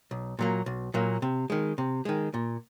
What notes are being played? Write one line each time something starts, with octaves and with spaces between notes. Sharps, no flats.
B1
A#2 F#3 A#3
B1
A#2 F#3 A#3
C3
D#3 G#3
C3
D#3 G#3
A#2